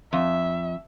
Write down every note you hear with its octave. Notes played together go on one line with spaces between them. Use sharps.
F2 E5